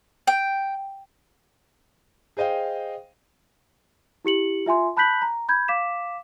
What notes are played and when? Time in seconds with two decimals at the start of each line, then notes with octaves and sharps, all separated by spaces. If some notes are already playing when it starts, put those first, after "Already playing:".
0.27 G5
2.37 G#4 C5 D#5 F5 G5
4.25 E4 G4 C#7 F#7
4.66 F4 E5 G#5 C6
4.97 A5 B5 F#6 G6 B6 F#7
5.22 A#5
5.49 B5 G6 G#6
5.68 F5 D6 B6 E7